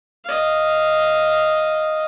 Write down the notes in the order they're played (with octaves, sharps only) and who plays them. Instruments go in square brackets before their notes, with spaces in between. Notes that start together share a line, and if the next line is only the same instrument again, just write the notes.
[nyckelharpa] D#5 F5